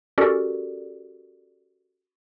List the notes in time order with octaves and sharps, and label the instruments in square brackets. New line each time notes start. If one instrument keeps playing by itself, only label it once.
[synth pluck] C#4 F#4 G4 A4 A#4 D5